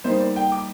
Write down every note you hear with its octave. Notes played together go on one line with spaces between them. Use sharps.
G3 A#3 D#4 C5
D5
G5
D6